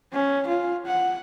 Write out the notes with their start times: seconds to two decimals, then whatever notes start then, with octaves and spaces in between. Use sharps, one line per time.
0.13 C#4
0.47 F4
0.86 F#5